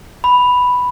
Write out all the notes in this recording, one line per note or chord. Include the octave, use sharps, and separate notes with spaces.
B5